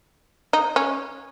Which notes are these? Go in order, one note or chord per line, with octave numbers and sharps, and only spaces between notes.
D#4
C#4